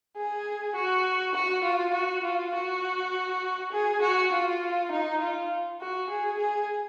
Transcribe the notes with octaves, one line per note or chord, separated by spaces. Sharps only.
G#4
F#4
F#4
F4
F#4
F4
F#4
G#4
F#4
F4
D#4
F4
F#4
G#4
G#4